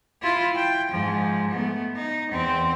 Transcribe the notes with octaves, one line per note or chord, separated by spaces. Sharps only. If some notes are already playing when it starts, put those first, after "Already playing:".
E4 F4
G5
G#2 F3
A3 B3
D#4
E2 C4